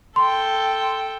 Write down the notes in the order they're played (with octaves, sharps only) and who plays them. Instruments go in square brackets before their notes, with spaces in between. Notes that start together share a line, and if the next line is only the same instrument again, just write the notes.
[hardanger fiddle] A4 G5 [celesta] C6